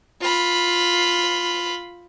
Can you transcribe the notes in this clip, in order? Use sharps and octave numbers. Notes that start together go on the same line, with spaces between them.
F4 B5